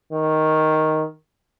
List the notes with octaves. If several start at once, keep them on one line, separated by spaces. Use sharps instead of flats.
D#3